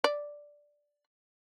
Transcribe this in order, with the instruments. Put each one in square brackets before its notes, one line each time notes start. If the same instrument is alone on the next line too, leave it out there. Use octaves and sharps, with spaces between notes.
[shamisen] D5